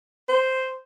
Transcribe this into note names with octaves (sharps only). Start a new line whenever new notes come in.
C5